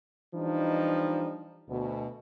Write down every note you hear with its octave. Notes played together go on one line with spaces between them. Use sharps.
E3 F3 G3 D4 D#4
D2 B2